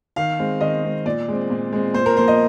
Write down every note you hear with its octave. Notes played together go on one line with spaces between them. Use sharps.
D#3 F5
G#3 C4
D#3 D#5
G#3 C4
A#2 D5
G#3 C4
A#2
G#3 C4
A#2 C5
A#4
F3 A#3 C5
D#5